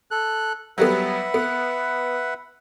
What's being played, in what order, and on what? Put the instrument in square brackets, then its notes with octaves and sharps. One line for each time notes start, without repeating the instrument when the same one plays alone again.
[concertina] A4 F#6
[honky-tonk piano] F#3 G3 B3 [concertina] B4 E5 F#5
[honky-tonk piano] B3